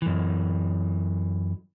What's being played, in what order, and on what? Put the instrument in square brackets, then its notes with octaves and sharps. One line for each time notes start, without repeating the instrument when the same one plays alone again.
[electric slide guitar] F#2 E3